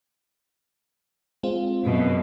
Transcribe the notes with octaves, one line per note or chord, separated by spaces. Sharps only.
G#3 C4 F4
F#2 B2